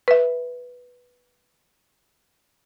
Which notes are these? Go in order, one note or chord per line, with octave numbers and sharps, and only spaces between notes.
B4 E5